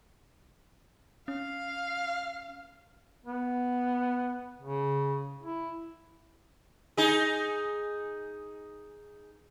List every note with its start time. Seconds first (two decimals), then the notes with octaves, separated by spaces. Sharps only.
1.28 C#4 F5
3.26 B3
4.61 C#3
5.43 E4
6.97 D#4 G#4